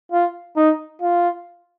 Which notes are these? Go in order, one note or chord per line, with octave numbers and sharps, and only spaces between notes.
F4
D#4
F4